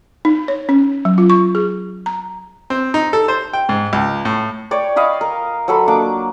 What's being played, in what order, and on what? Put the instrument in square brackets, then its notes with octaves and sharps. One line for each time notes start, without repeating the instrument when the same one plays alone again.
[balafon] D#4
C#5
C#4
F#3
F4
C#6
G#4
A#5
[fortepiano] C4
D#4
A4
C5
G5
G#2
C#2
A2
[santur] C#5 D5 G5
D#5 F5 B5 D6
A#4
F#3 A4 B5
A#3 D4 D6